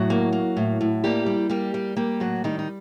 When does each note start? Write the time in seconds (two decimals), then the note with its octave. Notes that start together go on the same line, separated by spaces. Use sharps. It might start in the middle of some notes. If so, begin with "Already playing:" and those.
Already playing: A2 F#3 F#4
0.10 A#3
0.33 A#3
0.57 A2
0.81 A2
1.04 G3 A#3 G4
1.26 G3
1.49 G3 A#3 G4
1.74 G3
1.96 G3 A#3 G4
2.20 A2 F#3 F#4
2.44 D#3 G3 D#4
2.59 D#4